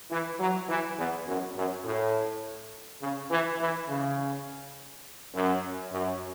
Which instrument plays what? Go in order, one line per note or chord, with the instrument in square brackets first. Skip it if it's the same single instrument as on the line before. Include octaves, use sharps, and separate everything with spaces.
[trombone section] E3
F#3
E3
E2
F#2
F#2
A2
C#3
E3
E3
C#3
F#2
F#2